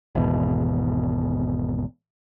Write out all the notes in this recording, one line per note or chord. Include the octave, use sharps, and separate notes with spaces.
G#1 E2 B2